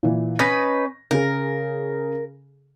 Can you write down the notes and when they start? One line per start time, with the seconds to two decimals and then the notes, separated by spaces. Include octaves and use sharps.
0.03 A#2 E3
0.39 C#4 D#4 B4 A#6
1.11 C#3 G#4 A#4